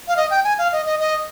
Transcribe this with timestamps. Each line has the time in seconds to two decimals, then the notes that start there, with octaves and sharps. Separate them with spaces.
0.08 F5
0.17 D#5
0.30 G5
0.44 G#5
0.58 F5
0.72 D#5
0.86 D#5
1.00 D#5